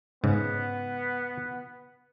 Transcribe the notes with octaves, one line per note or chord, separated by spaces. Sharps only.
G#2 C#3 B3